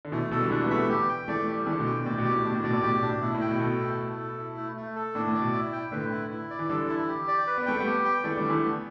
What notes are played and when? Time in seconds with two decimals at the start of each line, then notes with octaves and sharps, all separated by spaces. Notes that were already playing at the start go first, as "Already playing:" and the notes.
0.05 D3
0.12 B2 E3 A3
0.31 B2 E3 A4
0.41 D3 G3
0.51 E3 A3 D4
0.64 G3 B3
0.70 A3 E5
0.76 G3 B3
0.90 G4
1.09 G5
1.28 E3 A3 D5
1.47 G4
1.59 G3
1.67 E3 A3 G4
1.73 D3
1.80 B2
1.86 G5
1.93 B2
2.06 A2 D5
2.18 B2
2.25 G4
2.31 A2
2.44 B2 D4
2.54 A2
2.64 B2 D5
2.73 A2
2.83 B2 G4
2.96 B2
3.02 D4
3.09 A2
3.22 B2 E4
3.35 A2
3.41 G5
3.47 B2
3.60 B2 A4
3.80 E4
3.99 A3
4.18 A4
4.38 E4
4.57 A3
4.77 A3
4.96 A4
5.15 A2 D4
5.28 A2
5.34 D5
5.41 B2
5.53 E4
5.73 G5
5.92 A2 D3 B4
6.12 E4
6.31 E4
6.50 D5
6.59 E3
6.69 D3 G3 A4
6.89 E4
7.08 G4
7.27 D5
7.47 B4
7.57 B3
7.66 A3 G5
7.79 G3 B3
7.86 G4
8.05 G5
8.24 E3 A3 D5
8.37 D3 G3
8.44 G4
8.49 E3 A3
8.63 B3